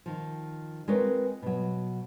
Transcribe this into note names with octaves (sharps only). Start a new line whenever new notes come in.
D#3 F3
G#3 C4 F4 A#4 B4 C#5
B2 F#3